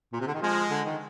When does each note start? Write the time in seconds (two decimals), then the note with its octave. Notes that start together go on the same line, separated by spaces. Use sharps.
0.13 A#2
0.20 C3
0.27 D3
0.34 D#3
0.41 F3 G#3
0.70 D3
0.85 D#3